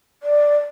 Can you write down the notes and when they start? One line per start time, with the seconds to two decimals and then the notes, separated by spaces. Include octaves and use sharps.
0.23 D5